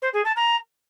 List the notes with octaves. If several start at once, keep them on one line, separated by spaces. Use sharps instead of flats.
C5
G#4
A5
A#5